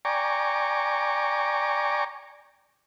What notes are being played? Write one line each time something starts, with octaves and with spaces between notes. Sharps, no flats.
D5 G5 G#5 A#5 C#6 D6